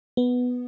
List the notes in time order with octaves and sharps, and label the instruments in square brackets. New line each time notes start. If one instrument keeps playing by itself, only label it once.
[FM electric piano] B3